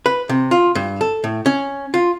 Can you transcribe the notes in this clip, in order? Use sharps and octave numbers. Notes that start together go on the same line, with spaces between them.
B4
C3
F4
G2
A4
A2
C#4
F4